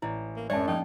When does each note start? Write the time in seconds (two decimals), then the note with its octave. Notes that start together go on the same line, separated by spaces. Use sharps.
0.02 A1 E4 D5
0.37 A#3
0.50 F#2 G#3 B3 D4 C#5 D5 E5 A5
0.67 F3 A#3 C#4 D#4 G5 A5